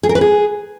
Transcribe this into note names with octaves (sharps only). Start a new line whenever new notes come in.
G#4
A#4
B4
G#4